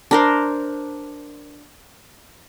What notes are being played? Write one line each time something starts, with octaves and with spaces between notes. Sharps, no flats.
D4 A#4 C5